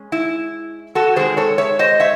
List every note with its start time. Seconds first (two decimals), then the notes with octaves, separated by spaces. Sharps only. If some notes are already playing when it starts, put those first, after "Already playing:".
Already playing: G#3 C#4
0.12 E4
0.95 F#4 A4
1.16 D#3 G#3 C4 G#4 C5
1.37 A4 C#5
1.58 C#5 E5
1.79 C5 D#5
2.00 C#5 E5